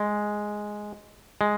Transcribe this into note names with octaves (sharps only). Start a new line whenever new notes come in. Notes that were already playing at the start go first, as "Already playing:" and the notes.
Already playing: G#3
G#3